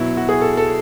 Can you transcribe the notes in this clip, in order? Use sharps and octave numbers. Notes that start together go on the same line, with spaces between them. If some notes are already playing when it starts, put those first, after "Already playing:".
Already playing: B2 F#3 E4
F#4
G#4
A4
A4